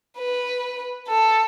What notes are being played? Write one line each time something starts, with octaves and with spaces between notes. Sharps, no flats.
B4
A4